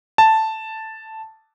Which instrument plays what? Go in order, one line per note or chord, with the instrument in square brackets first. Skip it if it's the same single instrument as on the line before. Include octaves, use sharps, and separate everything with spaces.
[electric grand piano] A5